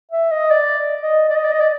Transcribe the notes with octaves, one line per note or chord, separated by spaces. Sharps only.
E5
D#5
D5
D#5
D5
D#5
D5
D#5
D5